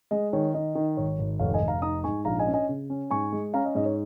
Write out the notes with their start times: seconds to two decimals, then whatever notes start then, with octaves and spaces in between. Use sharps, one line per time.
0.11 G#3 D#5
0.33 D#3 C#5
0.54 D#3 D#5
0.75 D#3
0.97 G#1 C#5
1.19 G#1
1.39 F1 C#5 F5
1.54 D#5 G#5
1.61 F1
1.68 F5 A#5
1.82 D#4 A#5 D#6
2.04 G#2 G#5 C#6
2.25 A#1 F5 A#5
2.39 D#5 G#5
2.47 C#4
2.54 D#5 G#5
2.69 C#3
2.90 C#4
3.11 G#2 G#5 C#6
3.33 G#3
3.54 C#4 F5 A#5
3.65 D#5
3.75 G#2 D#5
3.86 C#5